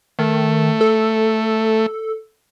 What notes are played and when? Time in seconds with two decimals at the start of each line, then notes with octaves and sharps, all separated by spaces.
0.19 D#3 A3
0.81 A4